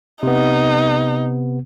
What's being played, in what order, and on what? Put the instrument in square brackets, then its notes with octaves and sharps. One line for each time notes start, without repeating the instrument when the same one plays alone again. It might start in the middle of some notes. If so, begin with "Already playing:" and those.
[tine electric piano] C3 B3 [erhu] D#4